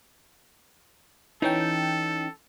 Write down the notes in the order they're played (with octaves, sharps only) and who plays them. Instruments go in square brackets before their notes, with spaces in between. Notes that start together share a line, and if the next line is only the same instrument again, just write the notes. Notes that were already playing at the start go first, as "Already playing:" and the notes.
[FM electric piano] E3 C#4 G5 [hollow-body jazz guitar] D#4 [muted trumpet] A4